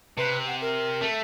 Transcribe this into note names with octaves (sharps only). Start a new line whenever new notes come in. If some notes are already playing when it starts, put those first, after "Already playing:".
C3 B4
F#5
A#4
A3